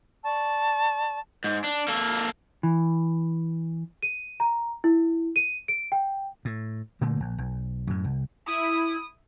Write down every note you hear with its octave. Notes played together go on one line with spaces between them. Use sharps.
D5 A5 C#6
G#2
D4
A#3 A4
E3
D#7
A#5
E4
D#7
D7
G5
A2
A#2 D3 A3 A#3
A#1
B1
F#2 A2
C2
E4 D#6